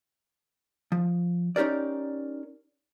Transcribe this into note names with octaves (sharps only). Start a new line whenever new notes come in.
F3
C#4 D#4 G4 A#4 D5